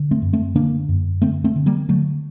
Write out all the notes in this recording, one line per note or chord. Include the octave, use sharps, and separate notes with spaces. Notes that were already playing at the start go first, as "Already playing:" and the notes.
Already playing: D3
A3 C4
F#2
A3 C4
D3 A#3 D4
F#2
D3 A3 C4
A3 C4
D3
G3 A#3
D3 F#3 A3